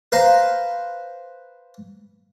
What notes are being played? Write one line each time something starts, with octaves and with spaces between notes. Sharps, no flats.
B4 C5 F5 A#5